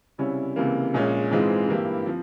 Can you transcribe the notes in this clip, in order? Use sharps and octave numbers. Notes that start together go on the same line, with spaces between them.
C#2 C3 G3 C#4 E4
C#2 C3 E3 G3 A#3
A#1 A#2 G#3 C#4
G#2 E3 G#3 C4 F4
G2 E3 A#3 E4 G4
F3 C4